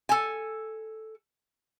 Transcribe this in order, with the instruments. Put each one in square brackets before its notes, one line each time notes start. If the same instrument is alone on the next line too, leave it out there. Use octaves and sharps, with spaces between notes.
[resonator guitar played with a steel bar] A4 G#5